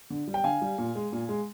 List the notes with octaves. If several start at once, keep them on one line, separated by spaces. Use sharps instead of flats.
D3
G3
G5
D3 F5 G#5
G3
A#2
G#3
A#2
G#3